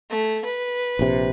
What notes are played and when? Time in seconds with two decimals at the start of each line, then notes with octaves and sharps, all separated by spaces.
0.10 A3
0.45 B4
0.99 A#1 C3